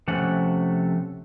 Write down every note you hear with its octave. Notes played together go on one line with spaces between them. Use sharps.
C3 F3 A3 C#4 F#5